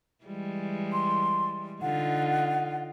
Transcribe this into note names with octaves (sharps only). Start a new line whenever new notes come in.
E3 G3 G#3
C6
D3 D#4 F4 F#5